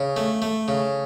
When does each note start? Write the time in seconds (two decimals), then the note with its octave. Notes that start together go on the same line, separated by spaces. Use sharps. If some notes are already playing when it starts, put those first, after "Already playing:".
Already playing: C#3
0.17 A3
0.42 A3
0.68 C#3